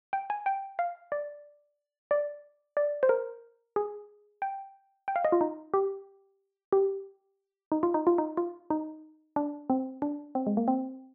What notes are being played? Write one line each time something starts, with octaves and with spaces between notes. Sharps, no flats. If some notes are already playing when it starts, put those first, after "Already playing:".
G5
G#5
G5
F5
D5
D5
D5
C5
A#4
G#4
G5
G5
F5
D#5
F4
D#4
G4
G4
D#4
F4
D#4
F4
D#4
F4
D#4
D4
C4
D4
C4
G#3
A#3
C4